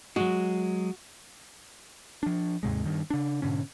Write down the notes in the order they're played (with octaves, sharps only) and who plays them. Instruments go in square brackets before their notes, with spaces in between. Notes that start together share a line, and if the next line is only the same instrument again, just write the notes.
[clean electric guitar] F#3 G#3 [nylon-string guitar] F#4
[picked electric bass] F3 D4
D#2 G#2 C3 G#3
G2 D#3
C#3 D4
G#2 B2 D3 C#4